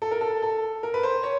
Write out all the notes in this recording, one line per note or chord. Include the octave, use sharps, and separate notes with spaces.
A4
A#4
A4
A4
A#4
B4
C5
C#5